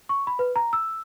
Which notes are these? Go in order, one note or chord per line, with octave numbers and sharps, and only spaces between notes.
C#6
B5
B4
A#5
E6